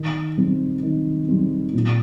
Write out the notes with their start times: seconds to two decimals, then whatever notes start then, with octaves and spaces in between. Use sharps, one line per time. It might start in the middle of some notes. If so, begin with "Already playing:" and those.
Already playing: D#3
0.37 G3 C4
0.83 D#3
1.28 G3 C4
1.74 A#2